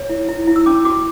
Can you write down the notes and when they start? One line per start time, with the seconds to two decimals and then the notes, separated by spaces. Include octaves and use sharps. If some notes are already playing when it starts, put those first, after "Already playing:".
Already playing: C#5
0.09 E4
0.29 E4
0.47 E4
0.56 E6
0.66 C#4 D6
0.85 F#4 D6